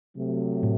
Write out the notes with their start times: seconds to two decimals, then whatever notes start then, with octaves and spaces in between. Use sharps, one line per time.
0.17 C3 F#3 A3
0.63 A2